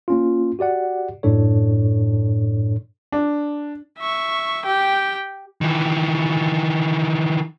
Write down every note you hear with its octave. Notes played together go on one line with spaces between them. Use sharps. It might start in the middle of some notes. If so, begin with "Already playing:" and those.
A#3 C#4 F4
F#4 G4 D5 F#5
F#2 A2 D4 A4 C#5
D4
E5 C#6
G4 G5
D#3 E3